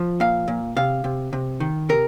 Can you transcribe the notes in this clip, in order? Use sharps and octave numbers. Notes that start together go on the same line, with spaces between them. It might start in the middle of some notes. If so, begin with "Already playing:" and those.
Already playing: F3
A#2 F5
A#2
C3 F5
C3
C3
D#3
C3 A#4